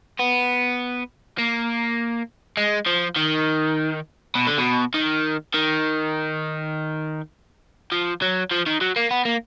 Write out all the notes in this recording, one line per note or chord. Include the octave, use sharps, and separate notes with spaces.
B3
A#3
G#3
F3
D#3
B2
D3
B2
D#3
D#3
F3
F#3
F3
D#3
F#3
A#3
B3
A#3